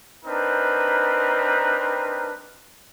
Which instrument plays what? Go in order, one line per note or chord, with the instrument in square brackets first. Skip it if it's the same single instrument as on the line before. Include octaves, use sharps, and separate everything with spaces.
[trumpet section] C4 D4 D#4 A#4 B4